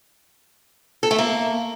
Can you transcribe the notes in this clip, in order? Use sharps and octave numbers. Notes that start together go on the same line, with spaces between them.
A4
A3
A#3